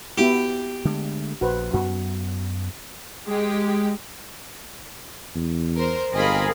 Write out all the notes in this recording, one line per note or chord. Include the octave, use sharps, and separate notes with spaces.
B3 E4 F#4 G4
D3 G#3 A3
A#1 F#4 B4 C5
F#2 B3 F#4
G#3 G4
E2
A#4 C5
G1 C4 G#4 A#4 D#5 F5 B5